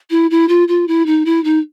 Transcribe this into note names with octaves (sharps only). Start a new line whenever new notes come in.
E4
E4
F4
F4
E4
D#4
E4
D#4